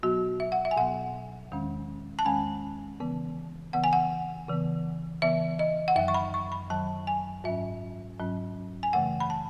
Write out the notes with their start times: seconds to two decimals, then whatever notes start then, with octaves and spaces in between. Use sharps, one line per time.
0.03 B2 F#3 B3 F#4
0.40 E5
0.52 F#5
0.65 E5
0.71 G#5
0.77 B2 F#3 B3 F#5
1.52 E2 D#3 G#3 C#4
2.19 A5
2.25 E2 D#3 G#3 C#4 G#5
3.00 C#3 E3 B3
3.73 C#3 E3 B3 F#5
3.84 G#5
3.93 F#5
4.48 C#3 E3 B3
5.22 C#3 E3 B3 E5
5.59 D#5
5.88 F#5
5.96 F#2 D#3 F#3 E5
6.08 C#6
6.14 B5
6.34 C#6
6.52 B5
6.70 F#2 D#3 F#3 A5
7.07 G#5
7.44 G#2 F#3 C#4 E5
8.19 G#2 F#3 C#4
8.83 G#5
8.93 F#2 C#3 E3 A3 F#5
9.20 B5
9.30 A5